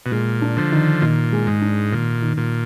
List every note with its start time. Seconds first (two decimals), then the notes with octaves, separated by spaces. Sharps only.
0.06 B2
0.12 A#2 G#3
0.42 D4
0.57 D3 F3
0.72 D#3
1.02 A#2 D#3
1.33 G#3
1.47 G#2
1.62 D4
1.92 A#2 D#3
2.22 D#3
2.37 A#2